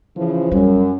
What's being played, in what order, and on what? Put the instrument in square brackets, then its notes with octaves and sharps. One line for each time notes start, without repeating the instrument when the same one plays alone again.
[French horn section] C#3 E3 F3
[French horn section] F#2 [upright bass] G3